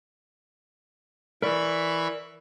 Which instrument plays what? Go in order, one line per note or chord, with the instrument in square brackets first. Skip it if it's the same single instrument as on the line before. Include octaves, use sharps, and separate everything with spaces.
[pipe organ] E3 B5 C#6 [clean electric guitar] A#4 D5